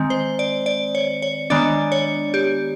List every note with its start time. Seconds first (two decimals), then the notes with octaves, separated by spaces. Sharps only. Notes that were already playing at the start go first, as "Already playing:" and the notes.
Already playing: D#3 G#3 C4
0.10 C5
0.39 D5
0.66 D5
0.95 C#5
1.22 C#5
1.50 D#3 G#3 B3 D4 D5
1.92 C#5
2.34 G4